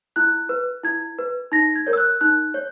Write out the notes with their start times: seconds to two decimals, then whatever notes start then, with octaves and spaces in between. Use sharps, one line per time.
0.16 E4 F#6
0.49 B4
0.84 E4 G#6
1.18 B4
1.52 D#4 A#6
1.76 G#6
1.87 A#4 C#5
1.93 E6
1.98 F#6
2.21 D#4 F#6
2.54 C#5